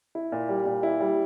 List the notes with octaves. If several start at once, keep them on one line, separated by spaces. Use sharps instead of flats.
E4
A#2
G3
A#2
E4
G3